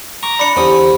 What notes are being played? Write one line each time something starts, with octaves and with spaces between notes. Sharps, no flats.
A#5 C#6 D6
D4 D5 B5 C#7
E2 D3 C#4 G4 C5 D#6